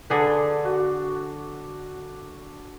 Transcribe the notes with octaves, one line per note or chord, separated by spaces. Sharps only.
D3 D4 G#4 A4 B4
F#4